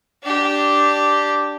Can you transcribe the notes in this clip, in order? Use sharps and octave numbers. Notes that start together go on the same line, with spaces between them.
D4 G4